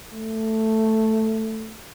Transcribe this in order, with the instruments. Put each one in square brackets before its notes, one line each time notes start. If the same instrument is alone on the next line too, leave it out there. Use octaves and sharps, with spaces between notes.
[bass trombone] A3